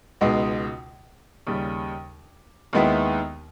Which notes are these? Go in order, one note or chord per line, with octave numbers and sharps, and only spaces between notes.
C#2 B2 G#3 D#4
D#2 C#3 G3
D#2 D#3 G#3 B3 E4